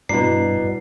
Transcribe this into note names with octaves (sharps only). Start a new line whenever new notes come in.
G2 B2 D4 E4 F#4 A#5 C7